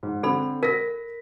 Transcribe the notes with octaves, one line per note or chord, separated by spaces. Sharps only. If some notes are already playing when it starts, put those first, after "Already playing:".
G#2
D3 C4 A4 B5
A#4 A#6 B6